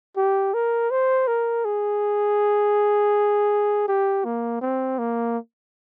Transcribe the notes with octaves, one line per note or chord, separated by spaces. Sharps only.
G4
A#4
C5
A#4
G#4
G4
A#3
C4
A#3